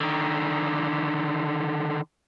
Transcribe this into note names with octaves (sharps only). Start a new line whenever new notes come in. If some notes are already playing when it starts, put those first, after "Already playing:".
D3 D#3